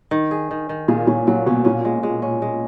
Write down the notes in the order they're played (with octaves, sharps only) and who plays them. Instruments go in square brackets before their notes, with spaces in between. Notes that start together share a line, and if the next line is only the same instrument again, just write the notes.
[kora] D#3
G#4
D#3
D#3
[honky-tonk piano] A#2 [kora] G#4
[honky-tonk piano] A#2 [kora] C#4
[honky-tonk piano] A#2 [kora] F#3
[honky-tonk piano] B2 [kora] C#4
[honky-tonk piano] A#2 [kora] C#4
[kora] G#3
G#3
C#4
G#3